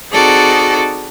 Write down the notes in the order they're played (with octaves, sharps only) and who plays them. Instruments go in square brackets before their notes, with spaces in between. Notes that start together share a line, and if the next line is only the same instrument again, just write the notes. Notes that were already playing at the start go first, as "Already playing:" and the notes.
[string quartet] C4 D#4 F#4 G#4 A4 D5